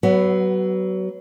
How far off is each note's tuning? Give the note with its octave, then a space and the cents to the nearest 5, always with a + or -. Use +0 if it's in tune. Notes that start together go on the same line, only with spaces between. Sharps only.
F#3 +25 B3 +0